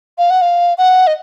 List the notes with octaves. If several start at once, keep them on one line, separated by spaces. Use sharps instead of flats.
F5
F#5
F5
F#5
D#5